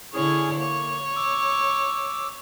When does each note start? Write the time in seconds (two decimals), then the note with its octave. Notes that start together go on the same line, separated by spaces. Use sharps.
0.14 D3 C#4 E4 G#4 C#5 G#5
0.59 A#3 C#5
1.16 D6 E6